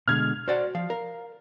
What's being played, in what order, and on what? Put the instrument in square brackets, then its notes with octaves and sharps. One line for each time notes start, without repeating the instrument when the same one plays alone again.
[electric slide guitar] B2 D3 G#3 [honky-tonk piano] F6 G#6
[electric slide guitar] F#4 [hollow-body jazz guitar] C5 D5 F#5
[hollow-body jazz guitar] F3 [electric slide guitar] F5
[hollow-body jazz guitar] A#4